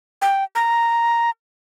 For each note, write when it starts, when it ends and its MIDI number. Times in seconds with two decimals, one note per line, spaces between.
0.22 0.44 79
0.55 1.30 82